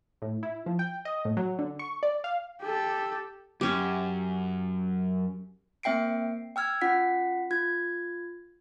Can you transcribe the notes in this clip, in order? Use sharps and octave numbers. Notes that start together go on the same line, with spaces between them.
A2
E4
F3
G5
D#5
A2
F#3
D3
C#6
D5
F5
G4 A4
F#2 C#4 G4
A#3 C4 E5 G5 C7 D7
G5 E6 F6 G#6
C#4 F4 F#5 B6
F4 G#6